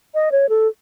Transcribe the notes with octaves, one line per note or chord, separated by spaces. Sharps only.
D#5
C#5
A4